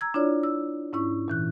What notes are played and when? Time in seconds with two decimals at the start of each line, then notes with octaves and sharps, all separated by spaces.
0.01 A#5 E6 G#6
0.14 D4 E4 F4 C#5 D5
0.43 E6
0.93 G#2 C#4 E4 C#6
1.28 A#2 E3 F#6